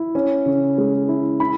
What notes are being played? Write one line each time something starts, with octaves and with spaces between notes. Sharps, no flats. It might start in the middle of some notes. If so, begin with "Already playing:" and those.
Already playing: E4
C#4
C#3
G#3
E4
E4 B5